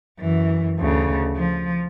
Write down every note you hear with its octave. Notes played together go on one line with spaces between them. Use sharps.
F#2 E3
D2 C#3
F3